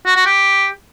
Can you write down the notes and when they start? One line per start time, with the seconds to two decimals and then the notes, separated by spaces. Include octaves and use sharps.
0.06 F#4
0.16 F#4
0.26 G4